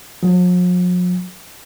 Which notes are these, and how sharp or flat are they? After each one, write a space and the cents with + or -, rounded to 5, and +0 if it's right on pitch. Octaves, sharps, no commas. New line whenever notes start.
F3 +45